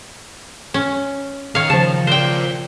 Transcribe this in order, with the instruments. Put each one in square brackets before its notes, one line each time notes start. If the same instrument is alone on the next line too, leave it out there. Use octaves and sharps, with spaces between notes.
[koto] C#4
[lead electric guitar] D#3 [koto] C#5 F5
[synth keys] C#3 F3 [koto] A5
[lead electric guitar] A#4 D5 [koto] C5 G5